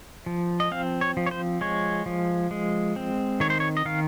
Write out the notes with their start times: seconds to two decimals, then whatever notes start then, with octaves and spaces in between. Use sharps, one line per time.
0.26 F3
0.60 D#5
0.71 C4 F5
1.01 C#5
1.17 F3
1.26 C#5
1.31 C5
1.61 G#3 C#5
2.06 F3
2.51 G#3
2.96 C4
3.40 D#3 C#5
3.50 C5
3.60 C#5
3.77 D#5
3.85 D#3 F5